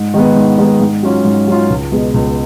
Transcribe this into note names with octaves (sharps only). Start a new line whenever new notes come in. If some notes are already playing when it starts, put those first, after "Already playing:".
Already playing: G#2
D#3 G#3 B3
G#2
D#3 G#3 B3
G#2
F#3 C#4 F4
G#2
F#3 C#4 F4
C#2
B2 G#3 B3
C#2